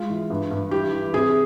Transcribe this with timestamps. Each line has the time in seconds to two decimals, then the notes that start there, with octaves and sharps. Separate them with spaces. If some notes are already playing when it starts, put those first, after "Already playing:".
Already playing: G#3 F4
0.10 E3
0.30 G2
0.51 G2
0.71 E3 G4
0.92 E3
1.14 C3 G#4